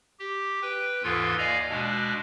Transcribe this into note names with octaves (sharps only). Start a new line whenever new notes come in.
G4
B4 G5
D#2 G#2 E3 F4 A4 G#6
D5 D#5 F5 G#5 A#5
B2 G#3 D4